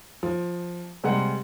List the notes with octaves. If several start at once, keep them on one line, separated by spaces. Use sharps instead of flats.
F3
C3 G3 G#3 F#5